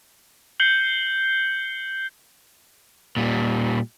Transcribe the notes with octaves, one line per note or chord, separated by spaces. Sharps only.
G6 C7 C#7 F#7 G7
A#2 G3